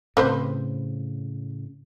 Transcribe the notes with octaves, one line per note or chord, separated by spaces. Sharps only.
A2 C#3 C4 B4 C5